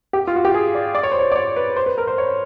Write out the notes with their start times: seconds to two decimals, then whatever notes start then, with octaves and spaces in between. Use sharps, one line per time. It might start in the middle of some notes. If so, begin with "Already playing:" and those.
0.13 G4
0.27 F4
0.36 F#4
0.45 G4
0.54 G#4
0.75 D5
0.95 D5
1.03 C#5
1.12 C5
1.19 C#5
1.32 D5
1.36 C#5
1.56 B4
1.76 C5
1.86 B4
1.98 A#4
2.07 C5
2.18 C#5